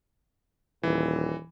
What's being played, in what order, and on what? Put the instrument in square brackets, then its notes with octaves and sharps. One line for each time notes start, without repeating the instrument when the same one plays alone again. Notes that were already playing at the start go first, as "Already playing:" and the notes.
[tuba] D#1 [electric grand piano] E3